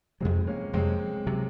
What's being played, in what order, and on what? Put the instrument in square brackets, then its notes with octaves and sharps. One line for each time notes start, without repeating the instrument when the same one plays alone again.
[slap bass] F2 C3 F#3 [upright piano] G#3 C4
[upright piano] A#3 C#4
[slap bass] F2 C3 F#3 [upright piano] G#3 C4
[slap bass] C3 F#3